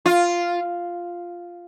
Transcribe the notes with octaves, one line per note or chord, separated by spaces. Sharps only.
F4